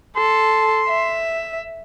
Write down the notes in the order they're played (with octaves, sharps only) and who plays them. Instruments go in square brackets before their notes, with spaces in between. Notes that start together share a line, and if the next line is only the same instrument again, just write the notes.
[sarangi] A4 [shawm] C6
[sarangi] E5